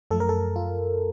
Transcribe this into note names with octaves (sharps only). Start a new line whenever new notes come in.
F#2 F3 A3 A4
A#4
A4
F4